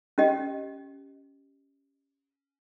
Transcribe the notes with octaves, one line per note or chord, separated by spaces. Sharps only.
C#4 G4 D#5 G5